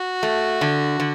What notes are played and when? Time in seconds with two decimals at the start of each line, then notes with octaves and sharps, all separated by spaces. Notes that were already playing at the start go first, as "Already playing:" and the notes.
Already playing: F#4
0.23 A3
0.61 D3
1.00 D3